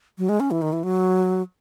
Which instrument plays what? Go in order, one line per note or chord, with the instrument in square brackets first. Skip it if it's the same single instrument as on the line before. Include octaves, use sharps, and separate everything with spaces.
[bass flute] F#3
G#3
C#4
E3
D#3
E3
F#3